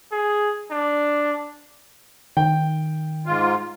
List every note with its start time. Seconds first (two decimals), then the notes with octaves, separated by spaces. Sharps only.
0.12 G#4
0.71 D4
2.37 D#3 G5
3.26 G#2 F4